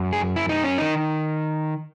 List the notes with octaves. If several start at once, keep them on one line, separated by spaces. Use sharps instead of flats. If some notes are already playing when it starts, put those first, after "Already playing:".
Already playing: F#2
G#4
E4
D#4
C#4
D#3 D#4